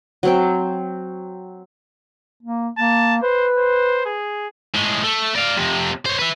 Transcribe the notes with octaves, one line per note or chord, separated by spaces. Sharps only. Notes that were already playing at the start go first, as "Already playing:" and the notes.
F#3 C4 G5
A#3
A#3 A5
B4 C5
C5
G#4
A2 G#3
A3
D5 F5
F2 C3
C5 C#5
B4 E5